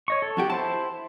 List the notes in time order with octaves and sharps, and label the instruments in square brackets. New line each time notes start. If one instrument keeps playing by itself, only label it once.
[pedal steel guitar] C#5 D#5 C#6
A4
[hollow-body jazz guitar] F2 F#4 G4
[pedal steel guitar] E4 C5 [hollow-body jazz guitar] A5